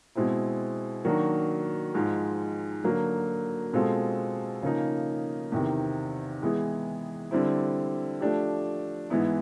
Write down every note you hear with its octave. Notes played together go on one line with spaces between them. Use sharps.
B2 G#3 C4 E4
D#3 F#3 A#3 D4 F#4
G#2 F3 G#3
D3 F#3 A#3
B2 G#3 C4 F4 A4
C#3 F3 A#3 D#4
E2 C3 D#3
E3 G#3 B3 E4 G#4
D3 G3 C4 E4
F3 A3 D4 G4
G#2 E3 G#3 B3 E4